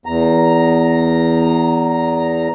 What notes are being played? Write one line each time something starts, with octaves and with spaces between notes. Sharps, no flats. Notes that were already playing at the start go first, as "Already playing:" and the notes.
E2 A#5